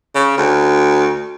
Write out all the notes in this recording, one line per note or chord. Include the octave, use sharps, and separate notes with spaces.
C#3
D2